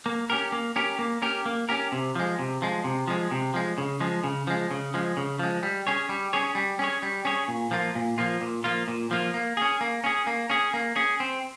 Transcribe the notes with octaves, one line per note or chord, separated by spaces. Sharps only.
A#3
C#4 G4 A#4
A#3
C#4 G4 A#4
A#3
C#4 G4 A#4
A#3
C#4 G4 A#4
C3
F3 G#3
C3
F3 G#3
C3
F3 G#3
C3
F3 G#3
C#3
F3 G#3
C#3
F3 G#3
C#3
F3 G#3
C#3
F3 G#3
G3
C#4 G#4 C#5
G3
C#4 G#4 C#5
G3
C#4 G#4 C#5
G3
C#4 G#4 C#5
A#2
F3 A#3 F4
A#2
F3 A#3 F4
A#2
F3 A#3 F4
A#2
F3 A#3 F4
A#3
C#4 G#4
A#3
C#4 G#4
A#3
C#4 G#4
A#3
C#4 G#4
C4